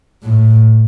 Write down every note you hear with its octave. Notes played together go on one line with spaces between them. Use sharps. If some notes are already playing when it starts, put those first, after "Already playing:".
A2